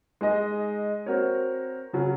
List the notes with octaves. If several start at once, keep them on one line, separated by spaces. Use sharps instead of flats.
G#3 D#4 G#4 D#5
C4 F#4 A#4 C#5
C#3 F#3 C#4